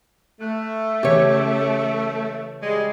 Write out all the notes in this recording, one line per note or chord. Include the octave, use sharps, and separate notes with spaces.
A3 F#6
C#3 E3 G4 C#5
G3 G#3